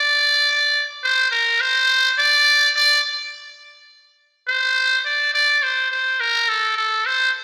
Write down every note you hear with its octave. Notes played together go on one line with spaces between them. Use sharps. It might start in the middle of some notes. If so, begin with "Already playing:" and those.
Already playing: D5
C5
A#4
C5
D5
D5
C5
D5
D5
C5
C5
A#4
A4
A4
C5